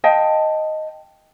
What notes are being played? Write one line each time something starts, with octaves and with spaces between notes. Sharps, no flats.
D#5 F5 G5 A5